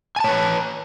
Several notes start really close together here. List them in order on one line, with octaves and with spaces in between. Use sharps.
G#5 A5 C#5 B4